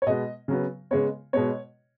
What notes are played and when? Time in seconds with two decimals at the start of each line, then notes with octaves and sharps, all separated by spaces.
0.02 C#5
0.07 B2 G#3 B3 D#5
0.48 C#3 F#3 B3
0.91 C#3 G#3 B3 C#5
1.33 B2 G#3 B3 C#5